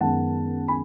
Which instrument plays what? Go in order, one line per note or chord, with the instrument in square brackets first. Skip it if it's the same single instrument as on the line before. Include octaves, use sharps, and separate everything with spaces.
[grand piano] F#2 D#3 G#3 B3 F#5 A5
G#5 B5